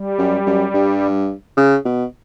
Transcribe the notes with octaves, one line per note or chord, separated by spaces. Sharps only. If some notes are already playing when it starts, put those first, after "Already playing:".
Already playing: G3
F#2
F#2
G2
C#3
B2